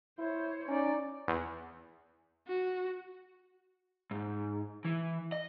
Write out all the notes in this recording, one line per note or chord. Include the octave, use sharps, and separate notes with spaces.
E4 C5 C#5
C#4 D#4 D5
E2
F#4
G#2
E3
D#5